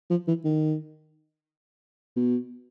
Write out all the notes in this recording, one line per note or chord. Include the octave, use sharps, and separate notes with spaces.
F3
E3
D#3
B2